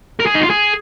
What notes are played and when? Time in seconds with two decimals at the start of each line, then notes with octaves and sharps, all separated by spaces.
0.20 A#4
0.26 G#4
0.35 D#4
0.42 F4
0.51 G#4